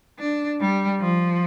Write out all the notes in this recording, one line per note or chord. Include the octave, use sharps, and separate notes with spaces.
D4
G3
F3